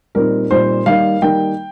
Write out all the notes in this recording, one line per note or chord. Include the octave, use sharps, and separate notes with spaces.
A#2 G3 C4 D#4 A#4
A#2 G3 C4 D#4 C5
D#3 G3 A#3 D#4 F5
D#3 G3 A#3 D#4 G5